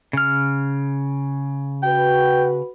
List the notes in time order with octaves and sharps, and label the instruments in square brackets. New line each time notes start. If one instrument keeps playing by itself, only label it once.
[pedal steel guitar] C#3 F6
[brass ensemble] F#4 B4 [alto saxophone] G5